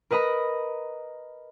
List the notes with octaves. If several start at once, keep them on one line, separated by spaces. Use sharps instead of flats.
A#4 B4 D#5 A#5 B5